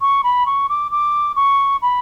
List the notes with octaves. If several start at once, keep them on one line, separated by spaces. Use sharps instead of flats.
C#6
B5
C#6
D6
D6
C#6
B5